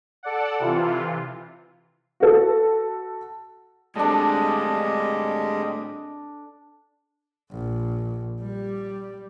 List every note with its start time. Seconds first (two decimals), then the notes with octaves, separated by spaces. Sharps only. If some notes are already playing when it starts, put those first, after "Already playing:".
0.23 A4 D5 F#5
0.59 C3 E3 F4
2.20 F#4 A4
3.96 A2 G3 G#3 C4 D4 A4 D#5
7.51 A#1
8.42 G3